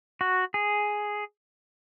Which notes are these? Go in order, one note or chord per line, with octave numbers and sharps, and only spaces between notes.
F#4
G#4